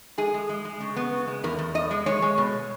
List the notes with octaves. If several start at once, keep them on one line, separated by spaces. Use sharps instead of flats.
G#3 G#4
G#3
G#3
G#3
C#3
B3
C#3
G#3
E2 A#4
E2
E2 D#5
G#3
G#3 C#5
G#3
B2